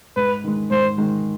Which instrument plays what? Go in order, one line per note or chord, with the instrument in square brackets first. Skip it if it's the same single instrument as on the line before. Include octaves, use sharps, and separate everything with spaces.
[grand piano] G#2 [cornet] B4
[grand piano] D#3 G#3
[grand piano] G#2 [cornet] C5
[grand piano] D#3 G#3